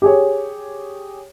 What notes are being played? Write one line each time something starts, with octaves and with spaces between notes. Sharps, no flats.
G4 G#4 C#5